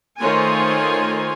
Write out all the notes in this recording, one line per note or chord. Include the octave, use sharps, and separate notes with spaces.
D#3 A3 F4 C5 C#5 G#5